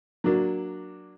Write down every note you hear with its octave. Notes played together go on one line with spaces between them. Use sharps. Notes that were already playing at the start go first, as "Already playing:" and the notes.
F#3 A#3 D4 F#4